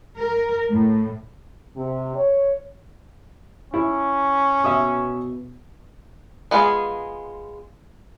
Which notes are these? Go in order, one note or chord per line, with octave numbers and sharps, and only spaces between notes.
A#4
A2
C3
C#5
C#4 E4
B2 E5 D#6
G#3 B3 F4 G#4